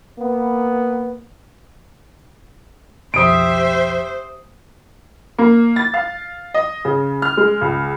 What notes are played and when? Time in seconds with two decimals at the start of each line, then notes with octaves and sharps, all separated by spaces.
0.18 A#3 B3
3.14 B1 F2 G4 C5 E5 D#6 D7
5.38 A#3
5.76 A6
5.94 F5
6.54 D#5
6.85 C#3
7.22 F6
7.37 G#3
7.61 C#2